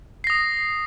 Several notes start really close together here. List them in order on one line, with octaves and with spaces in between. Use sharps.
C7 A#6 D#6